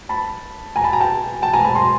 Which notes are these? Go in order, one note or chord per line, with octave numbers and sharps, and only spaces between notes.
A5 B5
G#5 A#5
A5 B5
G#5 A#5
G5 A5
G5 A5
G#5 A#5
A5 B5
A#5 C6